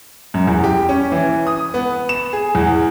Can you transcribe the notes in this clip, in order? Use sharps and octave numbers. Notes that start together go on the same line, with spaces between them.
F#2
E2
G4
C#4
E3
D#6
B3
E7
G#4
E2